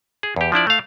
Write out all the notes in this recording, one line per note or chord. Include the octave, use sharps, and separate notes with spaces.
G#4
E2 G4
F3 D4 E4 D5
A3 F5